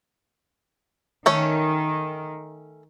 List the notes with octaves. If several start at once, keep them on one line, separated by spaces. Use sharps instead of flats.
D#3 A3 C#4 C#5